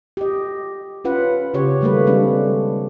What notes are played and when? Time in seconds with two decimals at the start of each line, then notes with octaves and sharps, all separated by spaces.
0.17 G4 D#5
1.05 C#4 F4 B4 F#5
1.54 C#3 G4 C#5
1.81 D#3 G3 A3 A#3 B4
2.07 G3 G#3 C4 D4